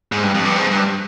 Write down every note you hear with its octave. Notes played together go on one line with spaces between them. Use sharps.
G#2
G2
F2
G2
G#2
G2